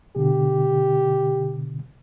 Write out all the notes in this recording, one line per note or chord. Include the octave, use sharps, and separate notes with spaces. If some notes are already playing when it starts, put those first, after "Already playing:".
B2 D3 G4